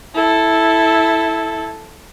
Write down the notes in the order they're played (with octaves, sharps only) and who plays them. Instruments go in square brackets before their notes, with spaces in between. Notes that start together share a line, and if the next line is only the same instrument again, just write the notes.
[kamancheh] E4 A4